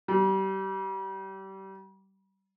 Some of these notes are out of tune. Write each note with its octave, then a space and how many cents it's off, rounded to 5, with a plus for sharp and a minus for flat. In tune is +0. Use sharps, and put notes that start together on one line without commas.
G3 -30